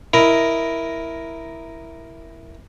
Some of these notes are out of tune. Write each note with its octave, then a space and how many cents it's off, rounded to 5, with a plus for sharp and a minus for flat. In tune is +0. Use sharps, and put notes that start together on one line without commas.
E4 +0 A#4 +5 D#5 +0